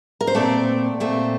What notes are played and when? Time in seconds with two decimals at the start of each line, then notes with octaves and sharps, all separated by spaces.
0.21 A#4
0.27 C5
0.35 A#2 A3 C4 D5
1.00 A#2 A3 C4